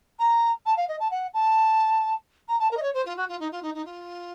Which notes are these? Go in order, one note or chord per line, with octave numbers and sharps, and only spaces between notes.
A#5
A5
F5
D#5
A5
F#5
A5
A#5
A5
A#4
D#5
C#5
C5
F4
F#4
F4
D#4
F4
D#4
D#4
F4